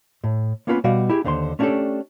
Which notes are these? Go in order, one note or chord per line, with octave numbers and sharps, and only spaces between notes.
A2
A#3 B3 C#4 F4 G#4 B4
B2 G3 F#4 D5 F5
E4 G4 G#4
D#2 D3 C5 A5 C6
A3 C#4 D4 F#4 G4 A4